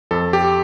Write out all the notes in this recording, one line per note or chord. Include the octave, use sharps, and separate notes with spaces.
F2 A4
G4